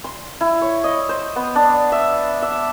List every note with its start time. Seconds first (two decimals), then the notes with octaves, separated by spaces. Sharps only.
0.04 C6
0.41 E4
0.62 C#5
0.84 D#5
1.09 C5
1.36 B3
1.55 D4
1.92 E5
2.42 E5